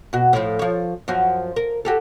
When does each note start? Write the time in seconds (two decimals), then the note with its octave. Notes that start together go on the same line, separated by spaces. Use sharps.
0.13 B2 F#4
0.33 A2 F3
0.59 F3 C#5
1.08 F#2 F3 F#4
1.56 A#4
1.85 F#4 G4 A4